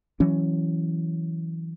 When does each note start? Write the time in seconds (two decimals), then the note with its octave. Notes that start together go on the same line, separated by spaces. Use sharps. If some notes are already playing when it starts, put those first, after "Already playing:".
0.20 E3 F#3 C#4